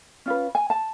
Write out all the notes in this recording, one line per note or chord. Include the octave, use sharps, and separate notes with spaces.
C#4 F4 B4
G#5
A5